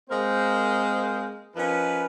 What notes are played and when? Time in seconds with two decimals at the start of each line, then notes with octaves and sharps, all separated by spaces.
0.10 G#3 A#3 C4 A#4 C5
1.56 F3 C#4 D#4 A#4 B4